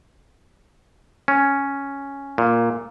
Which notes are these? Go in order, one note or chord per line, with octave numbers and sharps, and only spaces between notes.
C#4
A#2